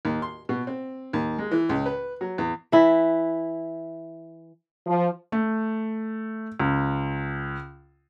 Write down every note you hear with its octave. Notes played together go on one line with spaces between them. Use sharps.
D#2
C6
B2
C4
D#2
G#3
E3
C#2
B4
F#3
E2
E3 E4
F3
A3
C#2